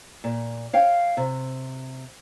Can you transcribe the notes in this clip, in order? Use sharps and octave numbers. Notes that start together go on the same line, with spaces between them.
A#2
C#5 F5 G5
C3